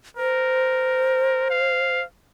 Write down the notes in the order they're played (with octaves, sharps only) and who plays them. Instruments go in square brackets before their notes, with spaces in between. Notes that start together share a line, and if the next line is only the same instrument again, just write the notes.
[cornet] A#4 [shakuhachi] C5
[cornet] F5